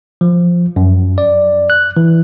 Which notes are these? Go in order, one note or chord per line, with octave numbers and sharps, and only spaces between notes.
F3
F#2
D5
F#6
E3